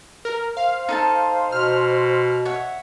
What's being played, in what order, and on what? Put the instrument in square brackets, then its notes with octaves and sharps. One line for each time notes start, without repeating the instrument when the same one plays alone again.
[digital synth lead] A#4
[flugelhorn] C5 [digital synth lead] F5
[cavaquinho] D#4 A4 A5
[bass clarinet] B2 [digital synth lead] F6
[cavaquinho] C#5 E5 F#5